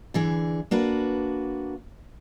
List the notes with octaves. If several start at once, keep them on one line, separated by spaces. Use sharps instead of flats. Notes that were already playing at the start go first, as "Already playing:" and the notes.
D3 E3 G#4
A#3 D4 F#4 B4